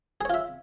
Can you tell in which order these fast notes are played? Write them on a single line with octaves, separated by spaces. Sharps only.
G#4 C#5 F4 E5